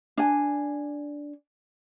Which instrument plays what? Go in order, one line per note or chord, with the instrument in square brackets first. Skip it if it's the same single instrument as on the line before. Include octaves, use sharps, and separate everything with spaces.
[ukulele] D4 G#5